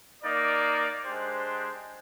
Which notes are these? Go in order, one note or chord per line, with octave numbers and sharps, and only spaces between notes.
A#3 D#4 A#4 D5
G#3 D4 G4 C5